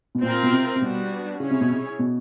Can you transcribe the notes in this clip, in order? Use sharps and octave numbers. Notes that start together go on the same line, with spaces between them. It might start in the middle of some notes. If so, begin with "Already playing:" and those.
B2
A#2 C4 F4 A#4
B2
C3
C3
B2 G3 B3 D4 F#4
C#3 C#4 E4 G#4 C#5
C3
B2
C3
B2